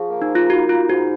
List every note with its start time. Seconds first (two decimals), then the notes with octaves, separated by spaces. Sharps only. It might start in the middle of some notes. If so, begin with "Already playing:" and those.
Already playing: F3 G#4
0.10 A#3
0.22 D#4
0.35 F4
0.49 D#4 F#4
0.69 F4
0.89 G#2 F#4